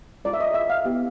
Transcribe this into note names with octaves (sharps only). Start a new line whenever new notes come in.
G#3 C#4 F4 D5
E5
D#5
E5
F5
B3 E4 G4